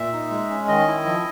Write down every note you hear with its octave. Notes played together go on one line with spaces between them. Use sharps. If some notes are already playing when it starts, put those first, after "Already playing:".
Already playing: A#2 E5
D#4
G#3
C#4
D#3 D#5
E4
F3